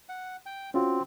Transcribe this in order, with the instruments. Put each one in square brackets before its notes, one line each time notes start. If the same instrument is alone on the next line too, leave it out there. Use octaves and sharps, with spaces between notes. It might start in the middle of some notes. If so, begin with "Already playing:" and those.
[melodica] F#5
G5
[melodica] C4 [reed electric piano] C#4 F4 F#4